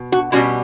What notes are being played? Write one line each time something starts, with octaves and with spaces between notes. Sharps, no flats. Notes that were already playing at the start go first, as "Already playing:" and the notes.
Already playing: B2
F#4
B2 G3 C#4 E4 F#4